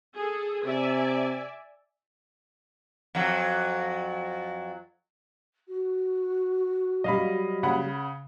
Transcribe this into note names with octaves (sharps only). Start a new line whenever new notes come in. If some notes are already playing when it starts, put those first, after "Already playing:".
G#4 A4
C3 D5 E5 G#5
F2 F#3
F#4
F#3 G3 D#5 F5 B5
C#3 F#5 B5